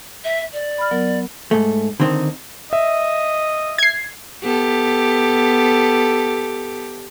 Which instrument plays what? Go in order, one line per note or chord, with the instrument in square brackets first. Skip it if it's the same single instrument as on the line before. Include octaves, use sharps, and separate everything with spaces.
[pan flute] E5
D5
[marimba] B5 F6
F#3 B3 A#4
[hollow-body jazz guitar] G#2 A3
D3 D#3 C4 C#4 D#4
[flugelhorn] D#5 [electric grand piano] E5
[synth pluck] G#6 C7
[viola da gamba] B3 G4 A4